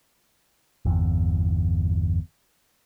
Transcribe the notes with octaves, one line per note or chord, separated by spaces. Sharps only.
G1 E2